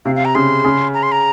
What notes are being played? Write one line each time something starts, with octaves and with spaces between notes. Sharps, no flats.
C3 F5
F5
A#5
C#3 C6
C#3
A#5
C6
A#5